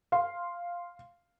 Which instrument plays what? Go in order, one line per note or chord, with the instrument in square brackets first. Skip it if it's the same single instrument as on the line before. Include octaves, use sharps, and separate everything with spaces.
[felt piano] F5 C6